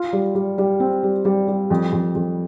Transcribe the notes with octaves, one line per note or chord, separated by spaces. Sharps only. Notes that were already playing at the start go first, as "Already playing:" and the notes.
Already playing: F4
G3
G3
G3
C4
G3
G3
G3
F2
F2
F2